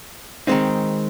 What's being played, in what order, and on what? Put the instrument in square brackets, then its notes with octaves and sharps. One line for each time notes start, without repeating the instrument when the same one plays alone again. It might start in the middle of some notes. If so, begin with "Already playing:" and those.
[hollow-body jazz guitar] D#3 G#3 C4 D#4